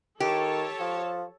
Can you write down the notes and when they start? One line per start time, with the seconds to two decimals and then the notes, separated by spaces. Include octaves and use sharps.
0.20 D#3 G4 A4 C#5 A5
0.80 F3